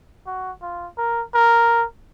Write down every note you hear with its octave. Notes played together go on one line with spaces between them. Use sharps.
F#4
F4
A#4
A#4